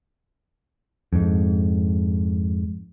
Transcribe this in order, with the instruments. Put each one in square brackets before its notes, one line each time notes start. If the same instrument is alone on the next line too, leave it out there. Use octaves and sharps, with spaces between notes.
[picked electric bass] F2 G#2